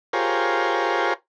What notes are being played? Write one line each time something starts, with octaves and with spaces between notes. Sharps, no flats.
F4 G4 G#4 A#4 C5 C#5